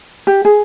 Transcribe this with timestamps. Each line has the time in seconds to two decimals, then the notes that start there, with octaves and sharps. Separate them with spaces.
0.27 G4
0.45 G#4